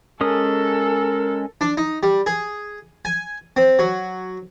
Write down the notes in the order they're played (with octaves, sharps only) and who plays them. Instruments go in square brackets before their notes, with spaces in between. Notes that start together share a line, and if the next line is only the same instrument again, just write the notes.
[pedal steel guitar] G#3 C#4 D#6 [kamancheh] A4 [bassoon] A#4
[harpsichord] D4
D#4
G3
G#4
G#5
C4
F#3